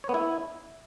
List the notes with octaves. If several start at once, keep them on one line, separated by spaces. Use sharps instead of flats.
C#5
B3
E4